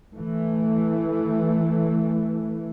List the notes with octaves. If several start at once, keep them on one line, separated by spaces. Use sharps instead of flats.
E3 A3